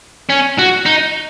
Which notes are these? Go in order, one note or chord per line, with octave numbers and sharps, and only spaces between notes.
C#4
F#4
D#4